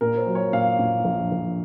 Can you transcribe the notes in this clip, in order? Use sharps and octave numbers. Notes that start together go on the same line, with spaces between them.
A#2 A#4
C5
F#3
C#5
A#2 F5
A#2
A#1
A#1